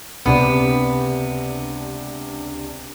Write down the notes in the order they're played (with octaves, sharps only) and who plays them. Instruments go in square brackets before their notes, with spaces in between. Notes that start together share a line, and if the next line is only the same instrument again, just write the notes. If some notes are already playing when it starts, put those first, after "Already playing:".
[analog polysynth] C#2 D4 G4 [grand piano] C3 [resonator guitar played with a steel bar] B3